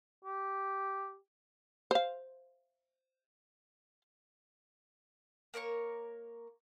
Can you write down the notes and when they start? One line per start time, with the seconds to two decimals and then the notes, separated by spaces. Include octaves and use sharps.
0.25 G4
1.91 C5 F5
5.54 A#3 A#4 C#5 C#6